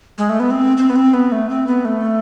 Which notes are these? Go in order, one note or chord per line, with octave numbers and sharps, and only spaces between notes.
G#3
A3
B3
C4
C4
B3
C4
B3
A3
C4
B3
A3